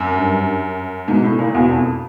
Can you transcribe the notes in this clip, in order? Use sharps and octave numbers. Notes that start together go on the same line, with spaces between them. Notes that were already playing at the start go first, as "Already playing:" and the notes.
Already playing: F#2
G2
G#2 B2
A2
A#2
E2 B2
F2